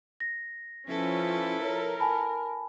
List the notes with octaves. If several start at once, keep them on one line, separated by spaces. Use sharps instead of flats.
A#6
F3 C#4 E4 A4 B4
A#4 C#5
G#5 A5 B5